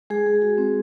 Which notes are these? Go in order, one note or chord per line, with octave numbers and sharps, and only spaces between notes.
G#3 G#4
G#3
F#4
C4